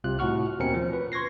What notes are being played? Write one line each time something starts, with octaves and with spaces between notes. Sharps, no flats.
C2 C3 F4 F#6
A2 F#4 F#5 C#6 F6
D#2 B2 C4 C#4 A#4 C#7
F3
B4
C6 C#6 G#6 A#6 C7